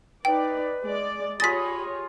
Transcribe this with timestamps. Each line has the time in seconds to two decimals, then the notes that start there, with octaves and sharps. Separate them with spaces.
0.25 D#4 B4 D5 G5
0.83 G#3 D5
1.40 F4 G4 G#4 C#5 D#5 B5 A6 B6